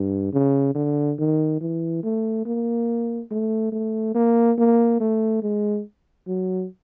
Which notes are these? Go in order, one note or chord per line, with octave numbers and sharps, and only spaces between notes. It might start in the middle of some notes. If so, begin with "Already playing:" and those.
Already playing: G2
C#3
D3
D#3
E3
A3
A#3
A3
A3
A#3
A#3
A3
G#3
F#3